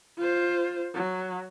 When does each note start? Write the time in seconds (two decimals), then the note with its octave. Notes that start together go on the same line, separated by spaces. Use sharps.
0.18 F4 C5
0.94 F#3